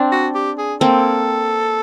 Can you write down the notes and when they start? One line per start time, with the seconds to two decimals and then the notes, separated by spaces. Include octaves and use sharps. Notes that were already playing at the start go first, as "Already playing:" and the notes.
Already playing: C4 D4
0.12 F#4
0.35 G4
0.58 G#4
0.81 A#3 C4 A4